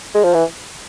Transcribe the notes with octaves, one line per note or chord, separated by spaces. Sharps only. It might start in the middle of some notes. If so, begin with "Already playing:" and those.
G#3
F3
E3